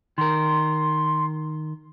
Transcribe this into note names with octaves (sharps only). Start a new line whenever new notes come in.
D#3 A#4 C6